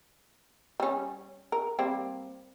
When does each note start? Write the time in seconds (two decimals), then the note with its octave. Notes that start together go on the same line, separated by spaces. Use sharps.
0.80 G3 C#4
1.52 A#4
1.79 G3 A#3 C4